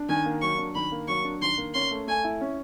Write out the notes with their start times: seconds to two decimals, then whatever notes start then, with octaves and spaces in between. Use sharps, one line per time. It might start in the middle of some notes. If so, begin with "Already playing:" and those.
Already playing: D4
0.09 D#3 G#5
0.25 A#3
0.42 F#3 C#6
0.58 D4
0.75 D#3 B5
0.92 A#3
1.08 F#3 C#6
1.24 D4
1.41 D#3 C6
1.58 A#3
1.74 C#4 C6
1.91 A3
2.07 A3 G#5
2.24 E4
2.41 C#4